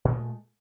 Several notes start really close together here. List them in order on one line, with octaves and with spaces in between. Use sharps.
A#2 G#3 A3